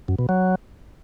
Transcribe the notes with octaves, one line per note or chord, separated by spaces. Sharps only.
F#2
B2
F#3